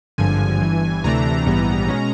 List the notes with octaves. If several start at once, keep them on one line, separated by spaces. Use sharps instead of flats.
G#1 G2 D3 F3 G#5
G1 G2 E3
D2 C3 E3 A3 D4 A#5
A#1 G#2 E3 G3 B3
B2 G#3 C#4